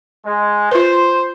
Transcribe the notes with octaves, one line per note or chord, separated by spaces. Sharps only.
G#3
F4 B4 C5